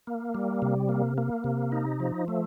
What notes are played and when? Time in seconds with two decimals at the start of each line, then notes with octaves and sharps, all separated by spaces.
0.07 A#3
0.35 G3
0.62 C3
0.89 A#3
1.18 A#3
1.44 C3
1.72 D#4
2.00 F3
2.28 A3